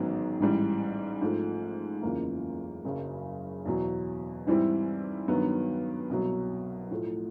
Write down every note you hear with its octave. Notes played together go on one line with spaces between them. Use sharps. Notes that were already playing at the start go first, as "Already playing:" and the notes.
Already playing: A1 G#2 D#3 F#3 B3
A1 G#2 E3 G3
G#2 F3 A3
F#1 E2 C#3 F3 A#3
F#1 F#2 C#3 F#3
E2 B2 F#3
G#2 E3 G3 C4 E4
G2 D#3 F#3 B3
C2 B2 F#3
A2 F3 A3